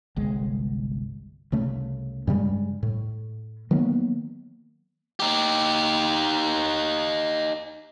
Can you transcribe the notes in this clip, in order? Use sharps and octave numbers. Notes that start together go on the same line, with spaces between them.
G1 C2 G#3
C2 C#3 A3
G2 C#3 G3 G#3
A2
D#3 F#3 A#3 B3
D#4 G4